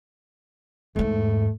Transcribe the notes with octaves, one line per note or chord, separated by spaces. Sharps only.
E2 G#2 A3